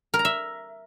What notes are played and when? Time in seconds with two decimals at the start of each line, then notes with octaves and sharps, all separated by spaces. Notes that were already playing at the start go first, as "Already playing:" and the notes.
0.14 A#4
0.19 A#5
0.25 E5